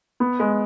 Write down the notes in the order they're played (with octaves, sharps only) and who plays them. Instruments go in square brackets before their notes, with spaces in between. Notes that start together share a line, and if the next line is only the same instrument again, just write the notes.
[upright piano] B3
G#3